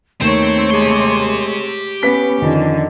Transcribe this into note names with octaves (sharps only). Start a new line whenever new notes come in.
D#2 A3 C4 D#4 C5 C#5
G#3 G4 C6
B3 C#4 B4 B6
F2 D3 D#3